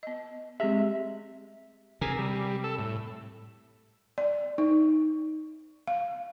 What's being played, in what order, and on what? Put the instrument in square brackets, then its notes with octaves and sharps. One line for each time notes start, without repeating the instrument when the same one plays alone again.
[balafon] B3 D#5
[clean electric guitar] G#3 E5 [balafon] C4 G4 G#4
[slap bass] C3 [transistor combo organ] G#4 A#4
[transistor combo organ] G3
A4 E6
A2
[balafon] D5
D#4
F5